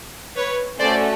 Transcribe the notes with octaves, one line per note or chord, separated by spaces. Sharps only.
B4 C#5
A3 C#4 F#4 A4 C5 D5